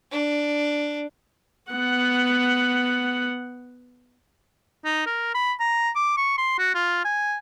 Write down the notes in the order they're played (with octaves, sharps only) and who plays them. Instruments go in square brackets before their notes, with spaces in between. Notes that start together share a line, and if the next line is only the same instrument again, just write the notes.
[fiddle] D4
[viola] B3 F#5
[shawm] D#4
A#4
B5
A#5
D6
C#6
C6
F#4
F4
G#5